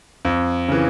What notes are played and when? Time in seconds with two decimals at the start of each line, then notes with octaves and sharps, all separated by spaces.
0.25 F2
0.68 C#3 E3